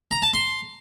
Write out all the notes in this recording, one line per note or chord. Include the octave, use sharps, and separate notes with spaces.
A#5
A5
C6